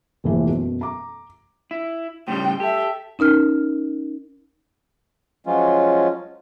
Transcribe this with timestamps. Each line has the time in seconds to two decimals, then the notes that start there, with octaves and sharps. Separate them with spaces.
0.24 F1 A#1 E3 A#3
0.47 F#2 B2
0.81 A#5 D6
1.71 E4
2.28 A2 C#3 G3 G5 C6
2.60 G4 A4 E5
3.19 C#4 D#4 A#4 F6
5.47 F3 F#3 G#3 C#4 F4